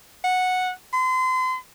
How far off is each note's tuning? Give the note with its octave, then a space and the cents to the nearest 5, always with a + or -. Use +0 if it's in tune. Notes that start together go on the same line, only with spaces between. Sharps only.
F#5 -10
C6 -35